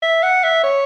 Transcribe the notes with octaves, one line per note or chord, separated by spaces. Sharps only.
E5
F#5
E5
C#5